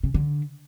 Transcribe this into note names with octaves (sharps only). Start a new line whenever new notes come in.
C#3
D3